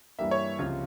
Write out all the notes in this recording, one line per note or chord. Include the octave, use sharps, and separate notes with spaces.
G2 E3 G3 A#3 E5
C#5
C#2 C3 F3 F4